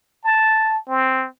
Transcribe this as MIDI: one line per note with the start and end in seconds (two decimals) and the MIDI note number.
0.24 0.79 81
0.88 1.27 60